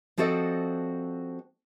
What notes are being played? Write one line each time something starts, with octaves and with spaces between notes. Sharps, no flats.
F3 C4 F#4 A4 D5 D#5